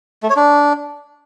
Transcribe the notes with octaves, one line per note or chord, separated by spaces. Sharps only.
A3
C#5
D4